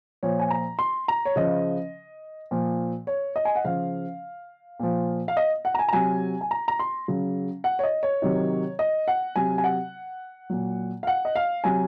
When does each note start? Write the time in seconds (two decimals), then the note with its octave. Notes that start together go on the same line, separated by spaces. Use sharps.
0.23 A#2 F3 C#5
0.39 G#5
0.50 A#5
0.79 C6
1.08 A#5
1.25 C#5
1.36 C#3 F3 D#5
2.51 A#2 F3
3.07 C#5
3.36 D#5
3.45 G#5
3.56 F#5
3.64 C#3 F3 F5
4.80 A#2 F3
5.28 F5
5.37 D#5
5.65 F#5
5.75 A#5
5.79 G#5
5.88 A#5
5.93 C3 F#3 G#5
6.41 G#5
6.51 A#5
6.68 A#5
6.79 C6
7.08 C#3 F#3
7.64 F#5
7.79 C#5
7.84 D#5
8.03 C#5
8.22 C3 D#3 F#3
8.79 D#5
9.08 F#5
9.36 C3 F#3 G#5
9.58 G#5
9.64 F#5
10.50 A#2 F#3
11.03 F5
11.07 F#5
11.25 D#5
11.36 F5
11.64 C3 F#3 G#5